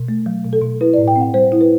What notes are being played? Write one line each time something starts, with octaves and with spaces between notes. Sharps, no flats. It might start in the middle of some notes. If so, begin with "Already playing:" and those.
Already playing: B2
A3
F#3
B2
A4
B2
E4 B4
A2 D5
G5
C4
F#5
G3 C5
E4
B4